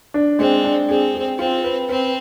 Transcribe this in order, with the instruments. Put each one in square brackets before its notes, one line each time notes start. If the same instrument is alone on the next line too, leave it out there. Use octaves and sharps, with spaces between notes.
[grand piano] D4
[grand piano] G#3 [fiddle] C4
[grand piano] D4
[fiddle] C4 [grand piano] G#4
[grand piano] G#4
[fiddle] C4 [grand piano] F4
[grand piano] B4
[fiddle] C4 [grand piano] B4